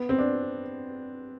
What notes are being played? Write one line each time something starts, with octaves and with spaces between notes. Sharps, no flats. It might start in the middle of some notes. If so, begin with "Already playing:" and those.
Already playing: B3
C4
D4